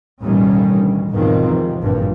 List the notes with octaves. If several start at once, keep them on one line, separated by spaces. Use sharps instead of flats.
A1 D#2 B2 D#3 G3 C#4
D2
E2 G#2 B2 D#3 F3 C4
C3
G#1 G2 A#2